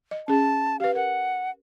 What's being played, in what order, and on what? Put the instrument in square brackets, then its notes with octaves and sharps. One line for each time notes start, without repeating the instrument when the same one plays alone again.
[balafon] D#5
[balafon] C#4 G#4 [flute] A5
[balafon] G4 B4 [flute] F5
[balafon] A#4 [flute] F#5